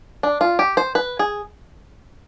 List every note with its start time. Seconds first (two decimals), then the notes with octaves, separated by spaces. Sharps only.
0.23 D4
0.41 F4
0.59 G4
0.77 C5
0.95 B4
1.19 G#4